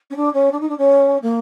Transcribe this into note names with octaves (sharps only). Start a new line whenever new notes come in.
C#4
D4
C#4
D4
D#4
D4
C#4
A#3